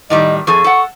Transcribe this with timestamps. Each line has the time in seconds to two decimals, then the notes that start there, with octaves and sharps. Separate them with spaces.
0.10 A2 D#3 G3 D#5
0.47 F2 G#4 A4 C#6
0.64 A4 F#5